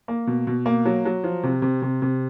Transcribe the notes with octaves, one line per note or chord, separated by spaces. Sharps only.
A#3
B2
B2
A#3
F#3
F#3
F3
C3
C3
C3
C3